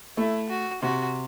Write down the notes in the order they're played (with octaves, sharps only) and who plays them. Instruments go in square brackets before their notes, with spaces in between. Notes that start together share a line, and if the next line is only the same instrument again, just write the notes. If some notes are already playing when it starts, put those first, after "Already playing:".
[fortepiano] A3 [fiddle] E4
[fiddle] F#4
[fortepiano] C3 [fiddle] F#4